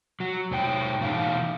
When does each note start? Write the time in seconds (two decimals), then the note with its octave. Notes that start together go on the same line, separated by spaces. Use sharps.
0.20 F#3
0.51 G#2 C#5 G5
1.01 B2 E3 D#4 F5